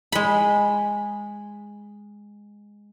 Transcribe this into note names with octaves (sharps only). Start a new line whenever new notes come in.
G#3 B5